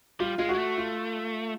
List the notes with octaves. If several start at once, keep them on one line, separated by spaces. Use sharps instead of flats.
G3 F4
G#3 F4
F#4
G#3
A3
F4